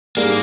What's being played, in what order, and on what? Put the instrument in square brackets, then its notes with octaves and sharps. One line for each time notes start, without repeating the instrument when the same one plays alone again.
[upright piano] G#2 G3 D4 G#4 [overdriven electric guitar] A#3